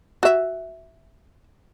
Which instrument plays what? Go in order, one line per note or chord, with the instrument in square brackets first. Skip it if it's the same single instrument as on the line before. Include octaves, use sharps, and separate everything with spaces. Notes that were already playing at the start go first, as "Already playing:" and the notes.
[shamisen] F#4 E5